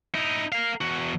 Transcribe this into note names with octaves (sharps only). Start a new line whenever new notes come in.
D#4 E4
A#4 F5
E2 F#4